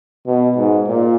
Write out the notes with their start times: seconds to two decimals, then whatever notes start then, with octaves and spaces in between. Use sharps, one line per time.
0.26 B2
0.57 G#2
0.88 A#2